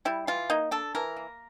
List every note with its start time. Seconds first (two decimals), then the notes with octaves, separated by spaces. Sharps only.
0.05 G3 E4
0.27 E3 F4
0.50 A#3 D#4
0.71 D4 A4
0.95 E3 A#4
1.17 A#3